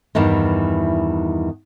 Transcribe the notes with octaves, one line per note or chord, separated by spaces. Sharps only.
E2 G2 D#3 E3